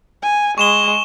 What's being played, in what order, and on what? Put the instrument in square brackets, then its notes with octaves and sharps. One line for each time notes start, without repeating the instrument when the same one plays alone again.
[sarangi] G#5
[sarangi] G#3 [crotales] C#6 E7 G7